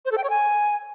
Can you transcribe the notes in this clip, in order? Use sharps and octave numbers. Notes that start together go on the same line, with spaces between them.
C5
A4
G5
C#5
G#5